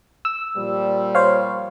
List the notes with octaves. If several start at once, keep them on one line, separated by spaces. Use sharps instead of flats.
E6
A#2 F3 G3
C5 C#5 F5